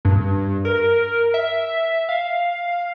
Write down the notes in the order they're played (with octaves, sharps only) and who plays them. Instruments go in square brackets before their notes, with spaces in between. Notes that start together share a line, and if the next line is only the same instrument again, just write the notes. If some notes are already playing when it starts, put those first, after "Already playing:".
[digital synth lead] G2
A#4
E5
F5